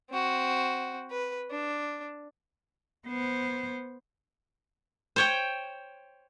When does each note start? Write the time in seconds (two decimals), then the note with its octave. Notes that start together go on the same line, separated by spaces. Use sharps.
0.10 C4 F#4
1.11 B4
1.50 D4
3.07 B3 C5
5.16 C5 C#5 G5